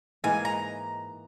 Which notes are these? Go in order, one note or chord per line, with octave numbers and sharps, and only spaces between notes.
G#2 E3 A#3 D#4 G#5
A#5